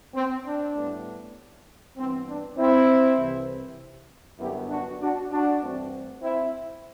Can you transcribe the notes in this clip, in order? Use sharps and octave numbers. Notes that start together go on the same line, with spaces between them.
C4
D4
A2 G3 B3
G2 E3 B3 C4
D4
C4 E4
C2 C3 E3
F#2 D3 G3 B3 E4 G4
D4 F#4
D4 F#4
D4 F#4
G2 E3 A3 C4
C4 E4